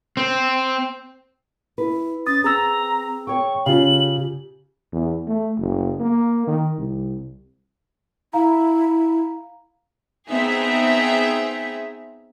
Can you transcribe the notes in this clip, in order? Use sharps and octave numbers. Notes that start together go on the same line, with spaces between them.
C4
E4 B4
C#4 D#6 A6
C4 G#4 A#5 E6
C#5 G5 C#6
C#3 F4 G4 F5 F#7
E2
A3
F#1
A#3
D#3
C2
E4 F5 A#5
B3 C4 D#4 G#4 E5